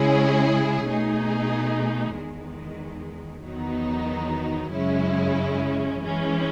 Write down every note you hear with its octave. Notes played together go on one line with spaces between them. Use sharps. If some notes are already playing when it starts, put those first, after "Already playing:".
Already playing: C#3 G#3 C#4 E4 G#4
B2 A3 D#4 G#4
E2 D#3 G#3
E2 D#3 F#3 B3 D#4
F#2 C#3 G#3 C#4 E4
E3 G#3 C#4